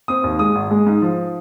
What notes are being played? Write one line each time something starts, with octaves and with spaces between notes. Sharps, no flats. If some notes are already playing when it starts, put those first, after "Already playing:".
C4 D#6
D#2
G#3 D#6
G#1
G#3
G#2
F3